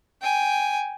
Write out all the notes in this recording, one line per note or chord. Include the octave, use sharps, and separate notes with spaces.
G5 G#5